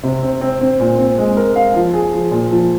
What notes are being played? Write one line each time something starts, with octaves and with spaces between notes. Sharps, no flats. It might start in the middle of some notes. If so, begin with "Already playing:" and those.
C3
C4
C4
C4
A#2
C4
G#3
A#4
F5
F3
G#4
F3
A#2
F3